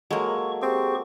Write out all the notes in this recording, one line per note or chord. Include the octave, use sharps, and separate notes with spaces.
F#3 G#3 A#3 A4 C#6
C4 G4 G#4 C#6